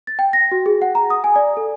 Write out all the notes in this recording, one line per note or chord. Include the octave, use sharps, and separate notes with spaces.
A6
G5
A#6
F#4
G#4
F#5
A#5
D#6
G#5
D5
A4